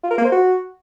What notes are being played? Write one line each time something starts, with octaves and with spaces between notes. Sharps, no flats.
F4
A#4
A#3
C5
F#4